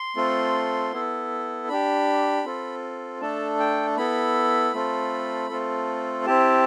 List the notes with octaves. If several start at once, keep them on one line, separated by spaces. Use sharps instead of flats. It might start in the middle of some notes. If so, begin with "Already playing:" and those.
Already playing: C6
A3 C4 F4 A4
B3 E4 A4
D4 G4 B5
C4 F4 A4
A3 D4 A4 A5
G5
B3 E4 A4 B5
A3 C4 F4 A4
A3 C4 F4 A4
C4 E4 G4 A5